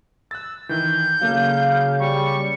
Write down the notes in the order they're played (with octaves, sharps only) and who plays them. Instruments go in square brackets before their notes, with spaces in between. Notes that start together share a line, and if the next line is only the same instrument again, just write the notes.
[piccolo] E6 [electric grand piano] F#6 A6
[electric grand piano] D#3 E3 [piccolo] G6
[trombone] C#3 [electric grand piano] F#3 A#3 A4 [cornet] F5
[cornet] G3 [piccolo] C#6